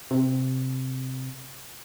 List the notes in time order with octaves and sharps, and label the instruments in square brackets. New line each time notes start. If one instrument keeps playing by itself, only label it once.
[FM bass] C3